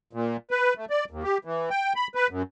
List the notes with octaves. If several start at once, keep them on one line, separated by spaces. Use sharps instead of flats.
A#2
B4
A3
D5
D#2
G4
E3
G5
B5
B4
F#2